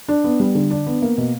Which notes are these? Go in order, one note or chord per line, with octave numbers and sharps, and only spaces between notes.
D4
B3
G3
D3
D4
B3
A#3
B2